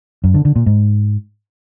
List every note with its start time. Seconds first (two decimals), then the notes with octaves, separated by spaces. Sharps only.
0.24 F#2
0.34 D3
0.45 D3
0.56 A#2
0.66 G#2